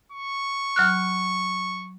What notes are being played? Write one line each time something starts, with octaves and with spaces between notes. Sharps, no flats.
C#6
F#3 F6 F#6